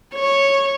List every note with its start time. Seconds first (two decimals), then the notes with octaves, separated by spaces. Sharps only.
0.14 C#5